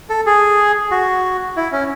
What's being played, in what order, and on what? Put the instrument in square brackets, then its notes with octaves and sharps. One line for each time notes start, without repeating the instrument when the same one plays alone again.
[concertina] A4
G#4
F#4
E4
C#4